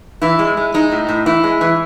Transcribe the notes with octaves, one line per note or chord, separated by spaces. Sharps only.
E3 E4
G#3
G#3
G#3 D#4
A2
A2
E3 E4
G#3
E3